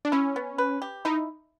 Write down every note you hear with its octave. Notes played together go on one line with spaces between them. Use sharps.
D4
C#4 E4
B3
B4
G4
D#4 E4